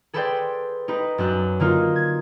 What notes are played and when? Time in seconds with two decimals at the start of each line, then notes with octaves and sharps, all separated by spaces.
0.13 G#4 A4 B4 C5 D5 G5
0.88 D#4 G4 B4
1.18 F#2 D4 F#6
1.60 D3 A#3 D#4 F4
1.96 G#6